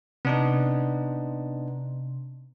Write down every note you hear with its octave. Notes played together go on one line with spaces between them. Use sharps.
C3 B3 D4 D#4